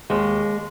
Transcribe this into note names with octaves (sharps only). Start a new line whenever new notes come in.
D#2 G#3